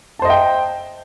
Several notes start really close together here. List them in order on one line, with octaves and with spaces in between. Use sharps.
A5 C5 D#5 E5 G5